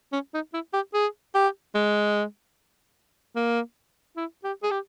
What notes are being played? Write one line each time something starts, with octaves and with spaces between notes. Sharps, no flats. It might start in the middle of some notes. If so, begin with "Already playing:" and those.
C#4
D#4
E4
G4
G#4
G4
G#3
A#3
E4
G4
G#4
G4